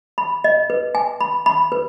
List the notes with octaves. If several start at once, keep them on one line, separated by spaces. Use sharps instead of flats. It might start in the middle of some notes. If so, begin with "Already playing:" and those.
B5
D#5
B4
G#5
B5
B5
B4